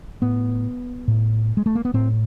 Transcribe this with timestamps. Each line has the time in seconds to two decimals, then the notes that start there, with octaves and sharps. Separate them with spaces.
0.22 A2 B3
1.08 A2
1.57 G#3
1.66 A3
1.75 A#3
1.85 B3
1.94 A2 C4